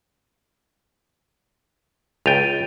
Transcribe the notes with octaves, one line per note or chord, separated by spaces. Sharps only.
C#2 G5 A6 D#7 F7